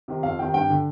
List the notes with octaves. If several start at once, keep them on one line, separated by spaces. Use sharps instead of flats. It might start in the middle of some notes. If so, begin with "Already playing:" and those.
C3 D#3
F2 F5
C3 D#3 G5
G2 G5
D3